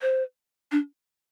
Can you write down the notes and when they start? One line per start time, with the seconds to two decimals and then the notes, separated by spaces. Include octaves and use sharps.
0.02 C5
0.72 D4